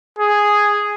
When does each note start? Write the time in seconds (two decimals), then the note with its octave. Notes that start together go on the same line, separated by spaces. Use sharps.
0.19 G#4